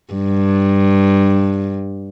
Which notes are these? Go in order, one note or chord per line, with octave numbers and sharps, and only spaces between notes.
G2